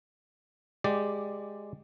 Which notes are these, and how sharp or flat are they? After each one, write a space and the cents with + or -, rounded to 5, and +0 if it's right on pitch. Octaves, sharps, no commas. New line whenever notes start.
G#3 +0 G4 -5 D5 +10